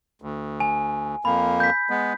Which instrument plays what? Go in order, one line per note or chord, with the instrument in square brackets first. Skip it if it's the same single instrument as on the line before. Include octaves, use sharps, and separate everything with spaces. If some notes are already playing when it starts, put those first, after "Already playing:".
[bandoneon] D2
[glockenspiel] G#5
[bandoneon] F2 A#3 [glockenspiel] B5
[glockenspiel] G6 B6
[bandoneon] G#3 B3